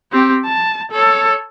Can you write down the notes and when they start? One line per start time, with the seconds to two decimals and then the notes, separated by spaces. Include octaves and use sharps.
0.12 C4 G4
0.45 A5
0.92 A4 C#5